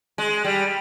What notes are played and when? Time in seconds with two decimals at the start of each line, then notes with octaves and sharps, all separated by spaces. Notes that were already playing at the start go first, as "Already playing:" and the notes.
0.18 G#3
0.44 G3